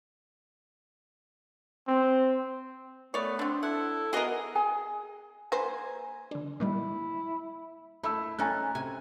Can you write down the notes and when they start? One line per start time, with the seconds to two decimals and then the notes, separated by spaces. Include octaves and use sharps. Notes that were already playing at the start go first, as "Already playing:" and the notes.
1.88 C4
3.14 A3 B3 C#5 D5
3.39 D3 C4 D4
3.63 E4 A4 F#5
4.13 B3 F#4 G#4 A#4 D#5
4.55 G#4 G#5
5.52 A#3 B4 C5 G#5
6.31 D3 D4
6.60 A#2 D#3 G3 E4
8.03 A3 E4 B5 E6
8.39 C#4 D#4 A4 G#5 A#5 F#6
8.75 C3 G#5